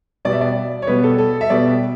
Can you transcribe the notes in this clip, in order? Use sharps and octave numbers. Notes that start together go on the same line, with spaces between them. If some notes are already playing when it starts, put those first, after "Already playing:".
B2 G3 B3 D5
E5
D5
C#5
B2 G3 B3 B4
A4
A4
E5
B2 G3 B3 D5